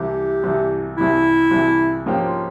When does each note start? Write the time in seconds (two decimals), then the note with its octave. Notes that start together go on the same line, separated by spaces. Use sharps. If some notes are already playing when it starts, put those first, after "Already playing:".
Already playing: C2 C3 E3 G4
0.44 C2 C3 E3
0.98 C2 C3 E3 E4
1.51 C2 C3 E3
2.06 G#2 F3 A#3 C#4 G4
2.24 F4